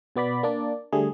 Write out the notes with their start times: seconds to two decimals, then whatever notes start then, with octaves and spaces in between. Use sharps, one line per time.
0.16 B2 B3 D5 B5
0.43 A#3 D4 D5
0.93 D3 G3 A3 G#4